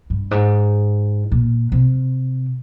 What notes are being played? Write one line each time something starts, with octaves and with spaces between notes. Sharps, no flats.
G2
G#2
A#2
C3